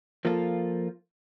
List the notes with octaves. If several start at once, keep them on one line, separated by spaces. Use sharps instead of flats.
F3 A#3 F4 A4